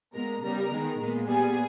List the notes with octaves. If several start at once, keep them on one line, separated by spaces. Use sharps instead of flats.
A#2 G#3 B3 A#4 A#5
C#3 G3 B3 A#4 A#5
D#3 G#3 B3
A#2 G#3 B3
A#2 G3 B3 G#4 G#5